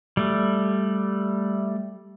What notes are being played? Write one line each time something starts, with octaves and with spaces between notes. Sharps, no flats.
G3 A3